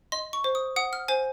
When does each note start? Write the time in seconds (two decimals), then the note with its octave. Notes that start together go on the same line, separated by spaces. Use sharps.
0.12 D#5 C6
0.33 C#6
0.44 C5
0.55 D#6
0.76 F#5 D#6
0.93 F6
1.08 C5 G#5